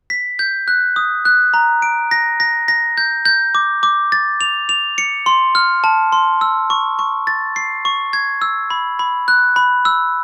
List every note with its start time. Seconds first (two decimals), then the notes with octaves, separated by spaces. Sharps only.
0.10 B6
0.39 G6
0.68 F#6
0.96 D#6
1.25 F#6
1.54 A#5
1.82 D7
2.11 A#6
2.40 A#6
2.68 A#6
2.98 G6
3.25 G6
3.55 D6
3.83 D6
4.12 A6
4.41 F7
4.69 F7
4.98 C#7
5.26 C6
5.55 F6
5.84 A5
6.12 C6
6.41 E6
6.70 C#6
6.99 C#6
7.27 A6
7.56 C7
7.85 C#6
8.13 G#6
8.42 E6
8.70 B5
8.99 B5
9.28 F#6
9.56 B5
9.85 E6